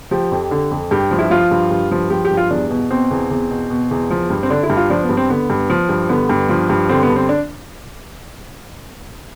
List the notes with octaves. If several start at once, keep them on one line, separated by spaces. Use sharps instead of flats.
F3 G4
F2
D3
F2
G2 G4
F3
E4
F3 F4
G2
G2
F3
F3 G4
G4
G2
F4
E2 D4
B2
B2 C4
E2
E2
B2
B2
E2
F3
G2
C4
D3 D4
E4
G2
F4
F3 D4
B3
G2
C4
D3 B3
G2
F3
G2
D3 B3
G2
F3
G2
D3 C4
B3
G2
C4
D4